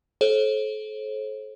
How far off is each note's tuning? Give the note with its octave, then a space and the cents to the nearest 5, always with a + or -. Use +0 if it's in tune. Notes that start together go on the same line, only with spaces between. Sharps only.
A4 -35 C5 +45